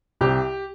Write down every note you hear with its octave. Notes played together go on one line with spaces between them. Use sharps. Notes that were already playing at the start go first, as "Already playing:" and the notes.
C2 G4